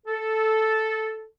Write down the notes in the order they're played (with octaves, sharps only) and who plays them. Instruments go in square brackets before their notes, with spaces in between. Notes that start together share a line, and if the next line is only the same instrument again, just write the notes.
[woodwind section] A4